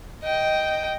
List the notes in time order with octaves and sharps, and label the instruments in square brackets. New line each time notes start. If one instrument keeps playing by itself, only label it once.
[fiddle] D#5 G5